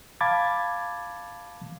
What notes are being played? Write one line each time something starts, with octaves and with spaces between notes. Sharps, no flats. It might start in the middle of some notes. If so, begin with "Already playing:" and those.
F5 A5 B5 D6 G#6 A6